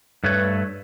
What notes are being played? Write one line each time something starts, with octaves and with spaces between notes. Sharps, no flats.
G2 A3 B4 C#5